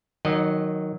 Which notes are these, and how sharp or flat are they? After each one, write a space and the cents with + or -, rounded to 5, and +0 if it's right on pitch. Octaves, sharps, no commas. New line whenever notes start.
D#3 +0 F#3 -5 D#5 -35